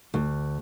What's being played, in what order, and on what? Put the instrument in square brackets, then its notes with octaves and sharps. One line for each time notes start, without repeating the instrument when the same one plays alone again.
[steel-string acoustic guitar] D2